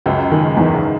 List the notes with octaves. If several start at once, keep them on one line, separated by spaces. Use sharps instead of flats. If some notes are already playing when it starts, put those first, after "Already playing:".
C#2 F#2 F#3
G#2 D#3 G#3
E2 G#2 G#3
C#3